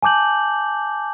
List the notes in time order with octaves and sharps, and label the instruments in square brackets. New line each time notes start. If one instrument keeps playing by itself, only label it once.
[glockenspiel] G#5 A5 D6 G6 F#7